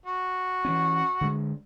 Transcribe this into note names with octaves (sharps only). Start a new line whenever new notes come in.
F#4
E3 C#4
D3 G#3